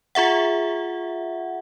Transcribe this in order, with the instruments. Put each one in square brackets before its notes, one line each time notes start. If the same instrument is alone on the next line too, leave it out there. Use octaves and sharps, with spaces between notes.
[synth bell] F4 G#4 E5 F#5